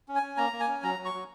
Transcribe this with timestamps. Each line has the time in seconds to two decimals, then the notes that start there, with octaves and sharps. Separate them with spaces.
0.08 C#4
0.15 G#5
0.23 C#4
0.37 A#3 A#5
0.52 A#3
0.60 G#5
0.67 C#4
0.83 F#3 A#5
0.99 F#3
1.05 C#6
1.14 F#3